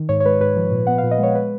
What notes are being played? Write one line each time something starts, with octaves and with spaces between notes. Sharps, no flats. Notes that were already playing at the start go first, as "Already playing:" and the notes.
Already playing: D#3
G#2 C#5
C#5
G#3 B4
G#2 B4
F3
A#2
B3 F#5
F5
A#2
D#5
G#3 C#5
B4